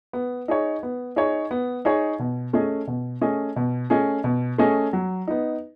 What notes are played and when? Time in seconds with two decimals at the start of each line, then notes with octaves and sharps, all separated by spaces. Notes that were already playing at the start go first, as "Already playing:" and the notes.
0.13 B3
0.48 D#4 G#4 C#5
0.83 B3
1.16 D#4 G#4 C#5
1.51 B3
1.85 D#4 G#4 C#5
2.19 B2
2.53 A3 C#4 G#4 D#5
2.87 B2
3.21 A3 C#4 G#4 D#5
3.56 B2
3.90 A3 C#4 G#4 D#5
4.24 B2
4.58 A3 C#4 G#4 D#5
4.93 F#3
5.28 B3 D#4